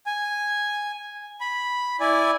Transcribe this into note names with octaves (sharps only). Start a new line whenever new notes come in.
G#5
B5
E4 D5 G#5